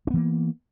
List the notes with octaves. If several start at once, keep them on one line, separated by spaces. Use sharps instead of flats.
E3 A#3 B3 D4